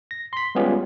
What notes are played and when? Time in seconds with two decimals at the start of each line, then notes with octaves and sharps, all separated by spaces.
0.11 A#6
0.33 C6 B6
0.55 G3 G#3 B3 C#4 F4 G4